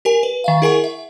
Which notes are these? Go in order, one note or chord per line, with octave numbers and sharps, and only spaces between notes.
G4 A#4 G#5
B4
D#3 E5 F5
E4 G#4 A#4 F#5 G#5 C#6
E5